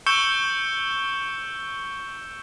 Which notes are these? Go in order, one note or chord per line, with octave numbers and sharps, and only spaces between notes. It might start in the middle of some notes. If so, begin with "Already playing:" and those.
C#6 E6 G6 C#7 E7 G7